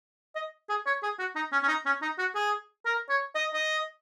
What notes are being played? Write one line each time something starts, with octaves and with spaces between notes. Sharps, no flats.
D#5
G#4
C#5
G#4
F#4
D#4
C#4
C#4
D#4
C#4
D#4
F#4
G#4
A#4
C#5
D#5
D#5